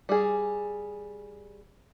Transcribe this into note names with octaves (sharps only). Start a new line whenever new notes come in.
G3 G#4